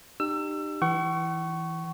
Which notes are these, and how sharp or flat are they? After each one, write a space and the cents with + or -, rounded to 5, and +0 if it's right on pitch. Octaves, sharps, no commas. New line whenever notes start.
D#4 -40 G4 +0 E6 +25
E3 +0 F#5 +45 C#6 +0